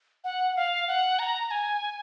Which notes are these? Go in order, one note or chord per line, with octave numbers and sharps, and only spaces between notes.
F#5
F5
F#5
A#5
G#5